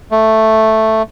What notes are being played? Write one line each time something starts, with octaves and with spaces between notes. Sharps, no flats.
A3